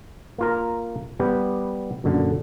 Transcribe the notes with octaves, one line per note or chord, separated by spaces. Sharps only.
A#3 F4 A#4
G3 B3 G4
F#2 A#2 D3